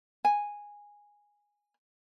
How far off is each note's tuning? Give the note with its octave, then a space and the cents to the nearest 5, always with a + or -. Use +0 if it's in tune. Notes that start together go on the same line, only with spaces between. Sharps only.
G#5 -10